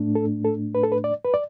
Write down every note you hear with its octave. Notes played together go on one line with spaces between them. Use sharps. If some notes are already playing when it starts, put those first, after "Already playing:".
Already playing: A2 A3 D4
A4
A4
B4
A4
B4
D5
B4
D5